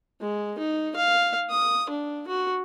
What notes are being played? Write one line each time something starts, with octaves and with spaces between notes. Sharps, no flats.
G#3
D#4
F5
D#6
D4
F#4